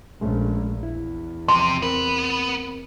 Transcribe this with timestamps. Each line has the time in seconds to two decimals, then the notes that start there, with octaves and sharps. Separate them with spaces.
0.21 A#1 G#3 A3 C#4
0.83 E2 E4
1.48 C3 F3 C6
1.82 B3 C4 A#4 B4